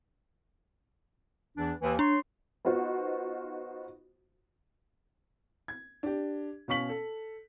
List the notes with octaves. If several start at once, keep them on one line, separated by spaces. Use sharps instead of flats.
E2 E3 D4
D#2 E3
D4 C#5 C6
B3 D#4 F4 F#4 C5
G#6
D4 G4
B2 C#4 F5 C#6 B6 F#7
A4